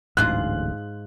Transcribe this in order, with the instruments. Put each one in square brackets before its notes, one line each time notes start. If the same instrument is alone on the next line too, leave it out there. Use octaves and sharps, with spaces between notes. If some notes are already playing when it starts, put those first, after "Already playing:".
[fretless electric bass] D1 A1 D2 [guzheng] G#2 F4 G#4 [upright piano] F#6